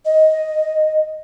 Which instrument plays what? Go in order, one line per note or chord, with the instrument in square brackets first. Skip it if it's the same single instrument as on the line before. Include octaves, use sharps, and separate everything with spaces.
[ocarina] D#5